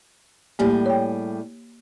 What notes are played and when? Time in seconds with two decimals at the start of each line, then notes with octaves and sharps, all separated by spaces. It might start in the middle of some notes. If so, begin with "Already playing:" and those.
0.59 A2 G3 A#3 G4 G#4
0.86 C#5 G5